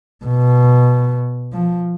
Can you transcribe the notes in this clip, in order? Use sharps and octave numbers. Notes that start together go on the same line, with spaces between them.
B2
F3